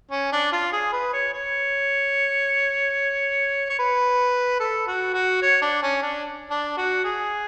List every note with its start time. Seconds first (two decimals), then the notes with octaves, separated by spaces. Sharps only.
0.11 C#4
0.32 D4
0.52 F4
0.72 G#4
0.93 B4
1.13 C#5
1.33 C#5
3.69 C#5
3.79 B4
4.60 A4
4.87 F#4
5.14 F#4
5.42 C#5
5.61 D4
5.83 C#4
6.02 D4
6.50 D4
6.77 F#4
7.04 G#4